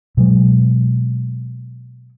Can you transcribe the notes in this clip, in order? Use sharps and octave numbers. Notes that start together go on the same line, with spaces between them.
B2 F#3 G#3